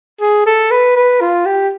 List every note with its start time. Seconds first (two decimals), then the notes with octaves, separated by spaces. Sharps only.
0.22 G#4
0.46 A4
0.71 B4
0.96 B4
1.21 F4
1.46 G4